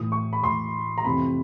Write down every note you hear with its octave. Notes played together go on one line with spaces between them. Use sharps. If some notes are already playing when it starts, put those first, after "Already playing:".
Already playing: A2 E3 D#6
C#6
B5
A2 E3 C6
A#5
F2 C3 E3 B5